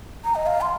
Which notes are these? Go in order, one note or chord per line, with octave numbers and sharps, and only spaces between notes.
A#5
D#5
F5
C6